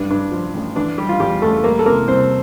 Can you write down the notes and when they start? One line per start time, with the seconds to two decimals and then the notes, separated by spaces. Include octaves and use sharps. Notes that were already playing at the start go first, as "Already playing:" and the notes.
Already playing: G2 D4
0.10 G2 D4
0.32 F3
0.54 A1
0.76 E3 D4
0.98 G3 G4
1.09 F4
1.20 E2 G3 G4
1.42 E2 A3 A4
1.58 A4
1.64 G3 A#3 A#4
1.79 A4
1.85 C3 A#3 A#4
2.07 C2 C4 C5